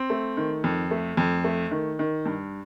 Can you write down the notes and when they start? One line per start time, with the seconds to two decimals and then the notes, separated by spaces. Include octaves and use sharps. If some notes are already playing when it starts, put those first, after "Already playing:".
Already playing: C4
0.10 A3
0.37 D#3
0.64 F2
0.91 A3
1.17 F2
1.44 A3
1.71 D#3
1.99 D#3
2.26 G2